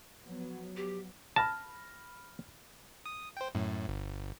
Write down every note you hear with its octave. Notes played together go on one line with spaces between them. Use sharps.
F3 F#3 B3
G4
A5 B5 F6 A#6
D#6
C5 G5
F#2 A2
G1